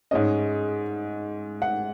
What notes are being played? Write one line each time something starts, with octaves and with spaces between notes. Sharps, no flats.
G#2 G#3 C#4 D#5
F#5